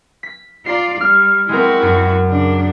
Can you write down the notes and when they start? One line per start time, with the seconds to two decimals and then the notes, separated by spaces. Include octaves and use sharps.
0.23 B6
0.66 F4 D5 A#5 C7
1.00 G3 F6
1.49 G#3 C4 E4 F#4 A#4
1.82 F#2
2.28 C#3 D4